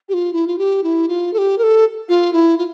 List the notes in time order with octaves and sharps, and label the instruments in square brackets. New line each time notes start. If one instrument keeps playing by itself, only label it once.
[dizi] G4
F4
E4
F4
G4
E4
F4
A4
G4
A#4
A4
F4
E4
F4